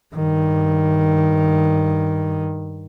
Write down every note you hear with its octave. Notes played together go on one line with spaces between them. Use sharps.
G2 D#3